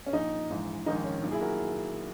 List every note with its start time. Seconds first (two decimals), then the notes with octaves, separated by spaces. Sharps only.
0.06 C#4
0.13 A#1 A#2 D#4
0.50 A#1 G#2 E3
0.86 A#1 G#2 D#3 D#4
1.04 C#4
1.22 B1 A#2
1.31 E4 G#4
1.41 F#4 A#4